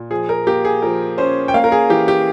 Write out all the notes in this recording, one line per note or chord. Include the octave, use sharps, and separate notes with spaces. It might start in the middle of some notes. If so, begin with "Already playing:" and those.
Already playing: A#2
F3 G#4
A#4
A#3 G4
G#4
F3 A#4
C#4 C5
G5
A#3 F5
A#4
G#4
E3 G4
G4